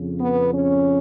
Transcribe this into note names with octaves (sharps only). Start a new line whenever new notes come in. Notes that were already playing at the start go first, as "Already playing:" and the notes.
Already playing: F2 C#3
B3
C#4